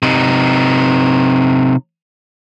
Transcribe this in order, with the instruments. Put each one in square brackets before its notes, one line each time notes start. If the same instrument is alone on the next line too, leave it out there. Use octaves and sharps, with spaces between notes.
[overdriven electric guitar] C3 D#4